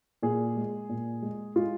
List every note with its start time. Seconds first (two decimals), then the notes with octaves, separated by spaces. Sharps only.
0.23 A#2 G#4
0.56 G#3
0.89 A#2
1.22 G#3
1.55 G#3 F4